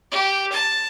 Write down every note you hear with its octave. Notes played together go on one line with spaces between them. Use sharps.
G4
A5